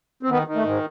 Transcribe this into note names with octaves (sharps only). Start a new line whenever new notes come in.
C4
D#3 B3
D#3
A3
G#2